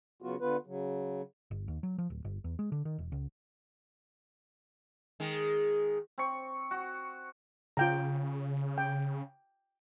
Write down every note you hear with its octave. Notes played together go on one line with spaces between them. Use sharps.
C#3 F#3 B3 F4 F#4
D3 B3 F4 B4
C#3 F#3
G1
D#2
F#3
F3
D1
G1
E2
G#3
D3
D#3
E1
C#2
D#3 G#3
C4 C#6
F#4
C#3 F4 G5 A#5
G5